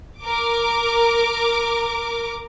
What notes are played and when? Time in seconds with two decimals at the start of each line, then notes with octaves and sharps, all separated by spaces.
0.21 A#4 D6